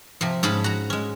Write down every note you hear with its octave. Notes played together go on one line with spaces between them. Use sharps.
C3 F3
G#2 C#4 G#4 A5 B5
F#4 A#5
G#3 C#4